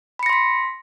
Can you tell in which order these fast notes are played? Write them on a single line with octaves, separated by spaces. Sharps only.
B5 C#7 A#6 C6 B6